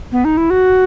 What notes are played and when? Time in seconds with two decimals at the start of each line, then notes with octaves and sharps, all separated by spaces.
0.12 B3
0.25 D#4
0.37 E4
0.50 F#4